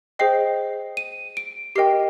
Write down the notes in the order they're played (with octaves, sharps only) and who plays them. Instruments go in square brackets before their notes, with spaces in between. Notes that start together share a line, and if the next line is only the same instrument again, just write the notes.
[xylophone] G#4 C5 D#5 G5 C7
D#7
D7
G4 A#4 D#5 G5 C7